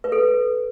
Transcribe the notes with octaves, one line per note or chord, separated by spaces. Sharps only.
B4
A4